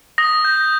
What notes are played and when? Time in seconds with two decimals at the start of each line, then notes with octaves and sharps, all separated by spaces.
0.18 D#6 A#6
0.45 G6